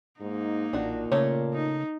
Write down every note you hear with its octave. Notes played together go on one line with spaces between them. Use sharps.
G#2 A#3 D#4
A1 A#2 D4 F#4
C#3 A3 A#3 C#5
D#4